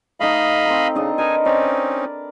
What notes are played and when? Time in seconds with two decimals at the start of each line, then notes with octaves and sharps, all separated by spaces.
0.20 A3 D#4 D#5 F5 B5
0.66 C4 A#5
0.95 C#3 D4 D#4 D#5
1.18 D#4 A#4 B4 G#5
1.45 C4 C#4 D#4 D5